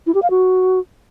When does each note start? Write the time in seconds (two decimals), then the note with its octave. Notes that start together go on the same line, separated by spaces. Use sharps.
0.07 E4
0.14 G4
0.22 F5
0.30 F#4